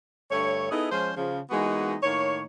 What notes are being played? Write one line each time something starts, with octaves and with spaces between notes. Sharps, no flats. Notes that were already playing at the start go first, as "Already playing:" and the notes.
G2 D3 A3 C#5
B3 D#4 E4 G#4 A4
F3 G#3 C#4 C5
C#3 F3
E3 G#3 A#3 B3 D#4 F#4
A2 D#3 A#3 C#5